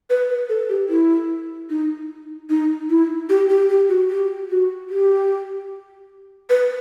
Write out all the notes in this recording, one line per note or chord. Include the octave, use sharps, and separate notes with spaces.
B4
B4
A4
G4
E4
D#4
D#4
E4
G4
G4
G4
F#4
G4
F#4
G4
B4